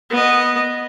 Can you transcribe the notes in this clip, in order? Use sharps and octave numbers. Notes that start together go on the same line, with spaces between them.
B3 D#5